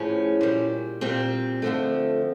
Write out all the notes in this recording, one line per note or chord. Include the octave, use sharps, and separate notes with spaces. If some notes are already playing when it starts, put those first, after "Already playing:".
Already playing: A2 F3 G#3 C#4
A#2 G3
A#2 G3 C4
F2 D3 F3 A3